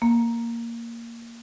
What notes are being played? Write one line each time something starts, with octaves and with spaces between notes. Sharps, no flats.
A#3